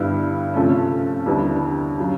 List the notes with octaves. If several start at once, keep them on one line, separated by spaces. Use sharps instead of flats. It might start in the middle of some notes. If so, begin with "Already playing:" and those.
Already playing: G2 D3 G3 B3 E4
C3 F3 A3 C#4
D#2 D3 G3 B3 E4
C#3 F#3